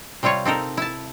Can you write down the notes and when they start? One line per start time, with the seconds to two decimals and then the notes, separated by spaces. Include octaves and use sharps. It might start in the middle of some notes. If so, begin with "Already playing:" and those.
0.23 C3 G3 C4 F4 C#5
0.45 C4 D#4 A4 A#4
0.77 E4 A5